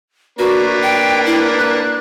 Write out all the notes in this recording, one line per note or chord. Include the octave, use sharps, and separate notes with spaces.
A#3 D4 F#4 B4
G5
E4
F#6